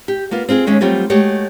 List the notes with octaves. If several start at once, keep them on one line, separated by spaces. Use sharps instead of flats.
G4
A#3 B3 F4
C4 F4 G4 G#4
D#2 G#3 C#4 E5
F#3 G3 A3 C4 F4 G4
G#3 A3 F#4 G4 C#5